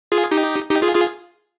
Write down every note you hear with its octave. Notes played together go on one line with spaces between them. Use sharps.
F4 G#4
D#4 G4
D#4 G4
F4 G#4
F4 G#4